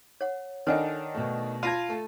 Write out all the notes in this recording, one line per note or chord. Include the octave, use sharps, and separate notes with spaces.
C#5 F#5
D#3 D4 D#4 A4 C#5 F#5 G#5 F6
B2 A3
F4 A5 B5 G#6 A#6 D#7
A3 A4